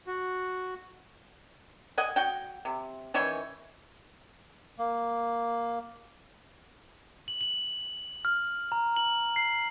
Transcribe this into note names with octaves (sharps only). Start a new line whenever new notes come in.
F#4
D#5 F#5 G#5
F#4 F#5 G5
C3
D#3 E3 C#4 C#5
A#3
F#7
F#7
F6
A#5
F#7
C7